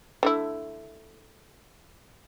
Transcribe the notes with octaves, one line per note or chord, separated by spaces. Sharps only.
D3 A3 E4